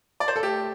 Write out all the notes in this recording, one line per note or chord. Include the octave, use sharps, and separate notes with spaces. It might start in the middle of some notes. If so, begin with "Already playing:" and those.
D5
C5
A4
A3 G4